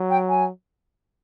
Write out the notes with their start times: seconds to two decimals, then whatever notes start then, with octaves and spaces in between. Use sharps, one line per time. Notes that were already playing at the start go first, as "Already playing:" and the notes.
Already playing: F#3
0.11 G5
0.29 G#5